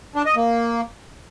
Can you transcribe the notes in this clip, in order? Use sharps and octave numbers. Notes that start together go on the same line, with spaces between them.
D4
D#5
A#3